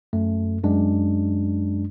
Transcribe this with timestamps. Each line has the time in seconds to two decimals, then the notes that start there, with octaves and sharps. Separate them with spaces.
0.13 F#2 A3
0.64 F#2 G#3 D4